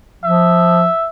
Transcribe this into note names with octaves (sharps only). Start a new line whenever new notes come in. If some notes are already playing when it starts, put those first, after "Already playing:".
F3 E5